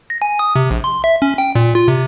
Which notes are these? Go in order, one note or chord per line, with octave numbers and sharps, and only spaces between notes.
A#6
G#5
D#6
C3
A#1
C6
E5
C#4
G5
A#2
F4
C3